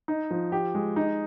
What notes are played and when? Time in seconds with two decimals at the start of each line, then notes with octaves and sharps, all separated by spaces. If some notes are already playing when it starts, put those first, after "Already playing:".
0.08 D#4
0.31 F3
0.52 G4
0.75 G#3
0.96 D#4